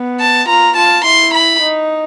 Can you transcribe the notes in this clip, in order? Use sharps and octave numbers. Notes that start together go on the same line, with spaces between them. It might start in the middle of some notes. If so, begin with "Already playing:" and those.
Already playing: B3
A5
F4 A#5
F4 A5
E4 C6
B5
D#4